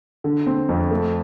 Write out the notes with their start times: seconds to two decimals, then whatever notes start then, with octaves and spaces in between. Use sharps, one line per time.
0.24 D3
0.47 C4
0.69 F2
0.91 A3